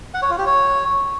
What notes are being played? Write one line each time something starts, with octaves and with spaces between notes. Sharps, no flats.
F#5
C#5
F4
G4
C#5